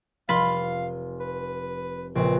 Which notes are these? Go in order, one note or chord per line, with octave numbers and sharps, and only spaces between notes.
F1 F4 F5 B5
B4
A#1 C#3 C4 B4